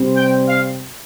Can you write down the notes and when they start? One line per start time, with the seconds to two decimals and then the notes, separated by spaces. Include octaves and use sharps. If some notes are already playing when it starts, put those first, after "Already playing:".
Already playing: C3 G3 C4
0.17 G5
0.49 F5